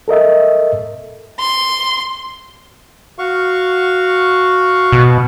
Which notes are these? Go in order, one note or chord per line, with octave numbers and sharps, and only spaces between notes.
A4 A#4 D#5 E5
C6
F#4 F5 C#6
B2